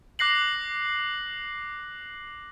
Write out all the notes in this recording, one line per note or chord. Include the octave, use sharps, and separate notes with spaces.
D6 F#6 A#6 C7 F#7